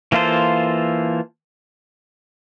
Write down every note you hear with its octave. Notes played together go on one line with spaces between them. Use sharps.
E3 A#3 F4 A4 C5